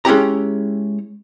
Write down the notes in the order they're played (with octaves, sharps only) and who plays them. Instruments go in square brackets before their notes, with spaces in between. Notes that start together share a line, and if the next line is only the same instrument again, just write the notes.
[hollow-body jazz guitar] G#3 C#4 E4 G4 A#5